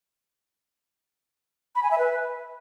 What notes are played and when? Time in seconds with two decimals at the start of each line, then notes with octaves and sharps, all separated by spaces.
1.75 B5
1.83 G#5
1.91 E5
1.98 B4